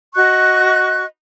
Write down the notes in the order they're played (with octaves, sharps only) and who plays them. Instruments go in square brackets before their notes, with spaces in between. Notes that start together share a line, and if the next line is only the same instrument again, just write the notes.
[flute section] F#4 D#5 C#6 F#6